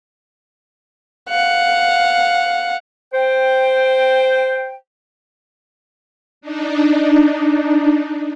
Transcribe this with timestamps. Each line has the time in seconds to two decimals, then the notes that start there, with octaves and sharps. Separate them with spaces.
1.29 F5 F#5
3.13 C5 G5
6.41 D4 D#4